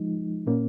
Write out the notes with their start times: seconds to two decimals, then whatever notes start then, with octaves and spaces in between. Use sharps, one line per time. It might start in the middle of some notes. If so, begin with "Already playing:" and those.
Already playing: F3 G#3 D#4
0.47 A#2 A#3 C#4